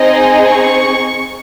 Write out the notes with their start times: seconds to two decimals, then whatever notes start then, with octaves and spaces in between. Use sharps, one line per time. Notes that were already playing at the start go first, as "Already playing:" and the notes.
Already playing: C4 D#4 G#4 D#5
0.49 C#6